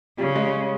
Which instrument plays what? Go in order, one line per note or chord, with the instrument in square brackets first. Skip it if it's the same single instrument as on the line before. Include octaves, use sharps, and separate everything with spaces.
[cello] C#3 [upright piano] G3
[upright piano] G#3